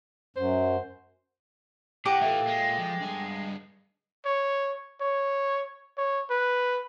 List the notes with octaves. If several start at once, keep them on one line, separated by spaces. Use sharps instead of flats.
F#2 C5
A2 G4 F#5 D6 D7
E3 A#3 F4 A4 E5
G#3
F3
G2 G#5
C#5
C#5
C#5
B4